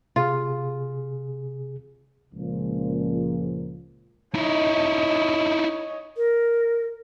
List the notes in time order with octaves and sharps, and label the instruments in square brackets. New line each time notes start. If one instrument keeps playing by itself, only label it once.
[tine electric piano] C3 G#4 [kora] F4
[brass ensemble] C#2 A#2 F3
[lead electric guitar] D#4 E4 [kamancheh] C#5 D#5
[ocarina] A#4